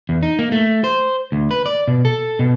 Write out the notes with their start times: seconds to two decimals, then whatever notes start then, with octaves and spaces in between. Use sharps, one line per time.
0.09 E2
0.23 D#4
0.39 A#3
0.52 A3
0.84 C5
1.32 D2
1.51 B4
1.66 D5
1.88 B2
2.05 A4
2.39 B2